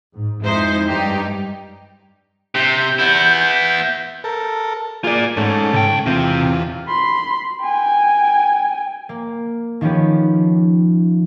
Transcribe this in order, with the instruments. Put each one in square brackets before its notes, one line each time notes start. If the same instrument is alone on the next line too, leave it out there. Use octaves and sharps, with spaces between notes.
[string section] G#2
F2 G#3 D#4 E4 C5
G2 D#4 G4
[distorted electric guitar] C3 [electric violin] G6
[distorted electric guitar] B3 E4
[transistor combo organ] A4 A#4
[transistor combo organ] A#3 G#4 [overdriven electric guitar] F4 D5
[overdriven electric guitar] G#2 [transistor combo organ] A3 C#4 A4
[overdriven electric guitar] C#2 G5
[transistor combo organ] E2 F4 [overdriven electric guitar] C3 C4
[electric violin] B5 C6
G5 G#5
[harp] A#3
D#3 F3 B3 C#4 G4